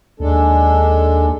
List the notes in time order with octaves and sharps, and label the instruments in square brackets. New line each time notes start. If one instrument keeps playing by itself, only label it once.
[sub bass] D#2 [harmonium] G#3 D4 A4